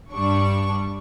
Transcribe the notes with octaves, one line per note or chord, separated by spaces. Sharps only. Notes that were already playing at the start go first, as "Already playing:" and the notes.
G2 G3 D4 C#6